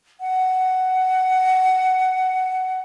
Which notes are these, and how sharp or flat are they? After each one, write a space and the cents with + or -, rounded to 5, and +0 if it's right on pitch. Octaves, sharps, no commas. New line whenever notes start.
F#5 +10